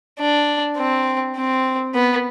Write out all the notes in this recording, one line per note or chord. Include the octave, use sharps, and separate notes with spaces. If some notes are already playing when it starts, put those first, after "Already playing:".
D4
C4
C4
B3